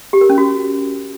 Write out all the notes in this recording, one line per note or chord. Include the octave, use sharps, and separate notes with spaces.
G4
A#4
C#4
F#4